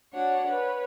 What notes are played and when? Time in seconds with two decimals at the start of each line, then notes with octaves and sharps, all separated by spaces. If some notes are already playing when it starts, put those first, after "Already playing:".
0.13 D4 F#4 C#5 F#5
0.45 B4 C#5